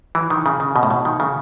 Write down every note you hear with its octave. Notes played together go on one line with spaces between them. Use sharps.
E3
D#3
C#3
C#3
B2
A2
B2
D#3
C#3